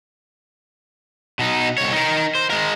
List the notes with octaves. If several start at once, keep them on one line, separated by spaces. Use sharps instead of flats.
B2 D#4
C2 C#5
D#4 A#4
C5
G#3 A#4